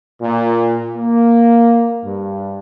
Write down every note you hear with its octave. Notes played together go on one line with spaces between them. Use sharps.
A#2
A#3
G2